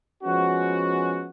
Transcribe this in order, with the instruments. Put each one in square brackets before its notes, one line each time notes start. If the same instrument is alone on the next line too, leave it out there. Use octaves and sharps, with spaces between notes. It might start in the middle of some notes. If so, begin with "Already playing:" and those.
[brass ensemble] F3 G#3 B3 C#4 F#4